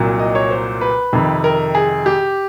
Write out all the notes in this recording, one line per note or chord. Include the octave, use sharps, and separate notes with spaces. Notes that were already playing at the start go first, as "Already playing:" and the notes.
Already playing: C2 A#2 F#3
D#5
C#5
C5
B4
F2 C3 D#3
A#4
G#4
G4